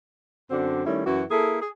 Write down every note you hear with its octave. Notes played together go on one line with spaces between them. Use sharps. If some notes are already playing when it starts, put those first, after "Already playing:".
F#2 D3 C4 D4 F#4
D#3 G3 A3 C#4 E4
F#2 E3 F#4
A#3 E4 G#4 A4
G#4